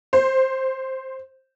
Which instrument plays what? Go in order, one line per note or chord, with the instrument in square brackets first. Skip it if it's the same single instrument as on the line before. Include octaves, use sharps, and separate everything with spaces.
[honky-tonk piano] C5